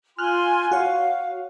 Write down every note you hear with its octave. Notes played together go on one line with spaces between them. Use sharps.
F4 G#5 C6 F6 F#6
F#4 C#5 F5